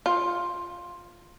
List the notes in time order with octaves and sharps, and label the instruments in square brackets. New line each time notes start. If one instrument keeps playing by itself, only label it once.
[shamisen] F4